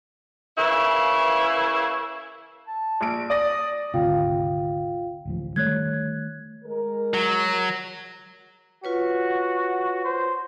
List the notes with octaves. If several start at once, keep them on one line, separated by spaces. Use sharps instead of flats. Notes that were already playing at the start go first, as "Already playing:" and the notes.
C#3 E3 A#3 E4
A5
A#1 D7
D5 D#6 A#6
G#1 D2 C3 F4 F5 G5
D1 A1 F3
D#3 G3 A3 C#5 F#6 G#6
G#3 A#4
F#3
F4 F#4 B4 C#5
C5